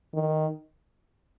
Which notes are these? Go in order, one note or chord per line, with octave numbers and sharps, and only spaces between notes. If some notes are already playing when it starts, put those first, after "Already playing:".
D#3